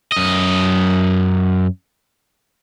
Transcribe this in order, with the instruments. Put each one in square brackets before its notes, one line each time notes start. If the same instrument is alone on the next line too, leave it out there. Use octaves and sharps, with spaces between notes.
[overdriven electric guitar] F#2 D#5